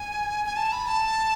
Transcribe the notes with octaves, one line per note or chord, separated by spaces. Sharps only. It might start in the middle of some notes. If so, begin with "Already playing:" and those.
Already playing: G#5
G#5
A5
B5
A5